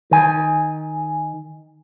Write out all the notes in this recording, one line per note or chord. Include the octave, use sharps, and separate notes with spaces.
D#3 G#5